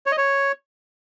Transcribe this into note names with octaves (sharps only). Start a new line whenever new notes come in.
C#5
D#5
C#5